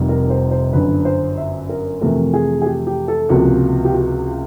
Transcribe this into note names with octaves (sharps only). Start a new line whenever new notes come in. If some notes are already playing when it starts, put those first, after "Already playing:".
Already playing: F1 F2 C3 D#3 G3
A#4
C5
C5
G1 F#2 D3 B4
C5
E5
A#4
F2 C3 E3 A3 A#4
G#4
G#4
G4
G4
A4
C#2 C3 F3 A#3 F#4
G4
F#4